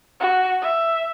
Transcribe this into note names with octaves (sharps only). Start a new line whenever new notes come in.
F#4
E5